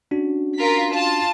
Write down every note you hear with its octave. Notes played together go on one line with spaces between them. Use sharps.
C#4 D4 F#4
F4 A#4 B6
F4 A5